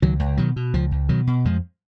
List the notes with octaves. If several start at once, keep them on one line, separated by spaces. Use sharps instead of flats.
C#2 D#3 F#3
C#2
B2 D#3 F#3
B2
C#2 F3
C#2
B2 D#3 F#3
B2
F2 F3 G#3